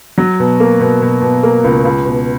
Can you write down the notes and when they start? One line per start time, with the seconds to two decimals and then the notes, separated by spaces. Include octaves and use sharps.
0.18 F#3
0.40 B2
0.60 A#3
0.80 B2
1.02 B2
1.22 B2
1.43 A#3
1.64 C#2
1.85 C#2
2.05 B2